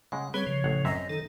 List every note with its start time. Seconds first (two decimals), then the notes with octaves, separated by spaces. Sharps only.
0.12 C#3 G#3 F#5
0.34 G3 C4 G#4 B4 C#5
0.47 C#3 F3
0.64 A1 F#5
0.85 F#2 C4 D#5 E5
1.09 D#3 D#4 A4